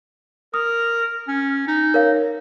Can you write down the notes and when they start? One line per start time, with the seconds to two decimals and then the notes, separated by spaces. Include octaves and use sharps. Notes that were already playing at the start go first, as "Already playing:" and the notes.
0.54 A#4 D#6
1.28 C#4
1.67 D#4
1.94 A#4 C#5 F5